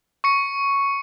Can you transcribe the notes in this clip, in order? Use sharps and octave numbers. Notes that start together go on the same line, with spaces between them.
C#6 C#7